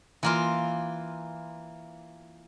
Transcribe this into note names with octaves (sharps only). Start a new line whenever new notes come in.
E3 A#3 F4